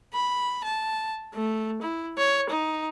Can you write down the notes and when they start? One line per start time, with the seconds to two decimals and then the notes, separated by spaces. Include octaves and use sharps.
0.13 B5
0.64 A5
1.34 A3
1.82 E4
2.18 C#5
2.50 D#4